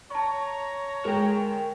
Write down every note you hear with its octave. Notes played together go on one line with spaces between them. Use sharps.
C#5 A5 A#5 C#6
G#3 A#4 G5